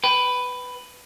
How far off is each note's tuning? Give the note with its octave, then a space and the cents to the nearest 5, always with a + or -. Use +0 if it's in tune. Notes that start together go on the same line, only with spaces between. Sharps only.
B4 +10 G5 +0